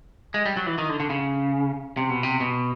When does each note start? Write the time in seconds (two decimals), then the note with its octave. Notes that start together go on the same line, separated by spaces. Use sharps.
0.34 G#3
0.45 G3
0.57 F#3
0.67 E3
0.78 D#3
0.89 D3
1.00 D3
1.10 C#3
1.97 C3
2.10 B2
2.23 C3
2.40 B2